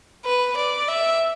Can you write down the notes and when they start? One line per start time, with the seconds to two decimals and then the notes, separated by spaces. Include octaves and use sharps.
0.25 B4
0.57 D5
0.88 E5